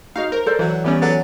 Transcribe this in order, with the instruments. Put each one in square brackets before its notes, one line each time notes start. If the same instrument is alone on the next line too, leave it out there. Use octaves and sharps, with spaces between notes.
[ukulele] D#4 F#4 D#5 [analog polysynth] F5
[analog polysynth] A#4 [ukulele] C5
[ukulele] A4 C5 D5
[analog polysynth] E3 [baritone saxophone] F#3
[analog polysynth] E3 B3 C#4 [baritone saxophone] G3
[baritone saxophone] F#3 [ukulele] A4 B4 D5